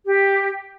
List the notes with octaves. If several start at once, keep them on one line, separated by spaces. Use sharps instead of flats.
G4